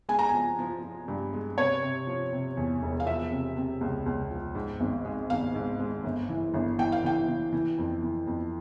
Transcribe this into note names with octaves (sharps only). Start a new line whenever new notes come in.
G#3 G#5
A#5
F3 G#5
F3
F3
G2
G#3
C3 C#5
C3
F3
C3
E2
E1
F5
F3 E5
C3
C3
C#2
C#2
F3
G#2
G#1
G#3
G#1 F5
G#2
G#3
G1
E3
G1
E3 G5
F5
E3 G5
E3
E3
F2
E3
F2